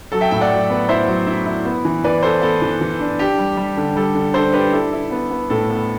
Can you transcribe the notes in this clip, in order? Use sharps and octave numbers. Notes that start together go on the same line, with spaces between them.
F#3 A4
E5 G5
A2 E5 G5
D5 F#5
F#3
B3
E4 C5 E5
F#3
E4
E4
B3
E3
E3 B4 D5
B3 A4 C5
B3 A4
E3
E3
D4
D4 G4
G3
G3
D3
G3 A4
D3
D4 A4 C5
D4 G4 B4
E4 A4
E4
B3
B3
A2 A4
B3